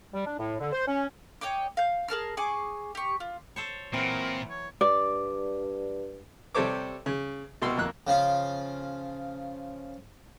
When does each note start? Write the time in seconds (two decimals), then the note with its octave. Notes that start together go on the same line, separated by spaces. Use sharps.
0.13 G3
0.26 D4
0.38 A2
0.60 D3
0.72 C5
0.87 C#4
1.41 C#5 D#5 G5 D6
1.77 F5 G6
2.08 G#4 A#4 A5 F6
2.37 G#4 G#5 C#6 D6
2.95 G4 C#6
3.20 F4
3.56 A4 C5 C#5
3.94 A#2 E3 F#3 C4 A#4
4.50 C#5
4.81 G2 D5
6.55 C3 G3 A4 C5 C#5 D6
7.06 C#3
7.62 C2 B2 C6 E6
7.77 F2 A#3 E6 F#6
8.07 C#3 F3 F4